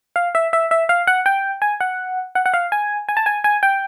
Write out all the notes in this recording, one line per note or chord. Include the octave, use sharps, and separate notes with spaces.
F5
E5
E5
E5
F5
F#5
G5
G#5
F#5
F#5
F#5
F5
G#5
G#5
A5
G#5
G#5
G5